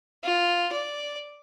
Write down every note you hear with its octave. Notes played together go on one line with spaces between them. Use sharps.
F4
D5